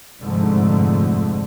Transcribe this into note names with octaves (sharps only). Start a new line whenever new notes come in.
F1 F2 G#2 D3 A3